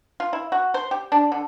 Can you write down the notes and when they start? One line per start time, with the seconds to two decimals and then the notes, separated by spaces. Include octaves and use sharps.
0.20 F4
0.33 E4
0.52 F#4
0.74 C5
0.91 G4
1.12 D4
1.32 D3